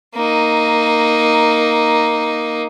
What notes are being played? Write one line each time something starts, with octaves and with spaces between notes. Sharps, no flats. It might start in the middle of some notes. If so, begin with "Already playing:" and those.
A#3 D#4